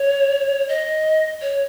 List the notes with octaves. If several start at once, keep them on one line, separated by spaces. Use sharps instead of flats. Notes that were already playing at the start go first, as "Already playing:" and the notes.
Already playing: C#5
D#5
C#5